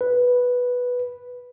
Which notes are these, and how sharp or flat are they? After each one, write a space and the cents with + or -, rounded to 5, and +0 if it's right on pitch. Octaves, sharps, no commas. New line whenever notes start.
B4 -5